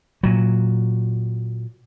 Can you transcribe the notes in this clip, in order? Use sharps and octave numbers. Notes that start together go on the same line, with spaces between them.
A#2 F#3